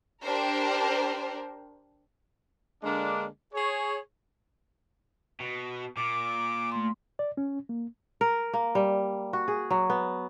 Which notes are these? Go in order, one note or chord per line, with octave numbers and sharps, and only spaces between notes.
D4 G4 A#4 C5
D3 G#3 A#3 D4
G#4 C#5
B2
A#2 D6
A3 C6
D5
C#4
A#3
A#4
A#3
G3
F#4
G#4
F#3
B3